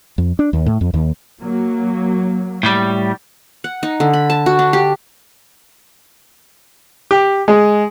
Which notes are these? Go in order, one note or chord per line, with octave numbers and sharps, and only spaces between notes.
F2
D4
D#2
A2
F2
D#2
F#3 A#3
A2 G3
F#5
D#4
D3
B5
A5
F#4
D4
G4
G4
G#3